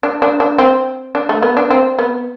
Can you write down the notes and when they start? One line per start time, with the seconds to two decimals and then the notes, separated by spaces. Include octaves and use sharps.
0.03 D4
0.22 D4
0.40 D4
0.58 C4
1.15 D4
1.29 A3
1.42 B3
1.57 D4
1.70 C4
1.99 B3